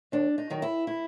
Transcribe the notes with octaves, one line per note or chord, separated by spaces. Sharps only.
D#2 D4
D#4
D#3 F#3
E4
E4